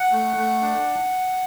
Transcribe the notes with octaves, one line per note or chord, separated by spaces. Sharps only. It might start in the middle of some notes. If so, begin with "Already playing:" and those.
Already playing: F#5
A3
A3
D4